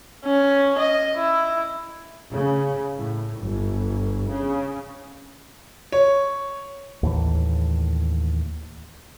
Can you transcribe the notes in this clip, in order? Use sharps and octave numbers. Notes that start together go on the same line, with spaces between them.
C#4
D#5
E4
C#3
A2
G1
C#3
C#5
D#2 A2 E3